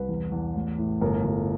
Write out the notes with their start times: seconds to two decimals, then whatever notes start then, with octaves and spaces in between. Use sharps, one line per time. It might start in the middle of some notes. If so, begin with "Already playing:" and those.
Already playing: C2 B4
0.09 E2
0.32 E2
0.55 A1
0.78 A2
1.01 G1 A#4
1.25 G1